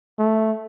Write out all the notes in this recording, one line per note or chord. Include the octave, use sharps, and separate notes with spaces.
A3